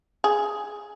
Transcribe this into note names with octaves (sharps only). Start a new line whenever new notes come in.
G#4